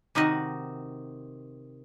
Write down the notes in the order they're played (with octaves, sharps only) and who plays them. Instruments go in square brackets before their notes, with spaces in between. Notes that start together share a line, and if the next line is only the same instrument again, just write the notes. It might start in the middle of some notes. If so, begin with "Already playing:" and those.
[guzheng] C3 D#3 D#4 F#4 D#5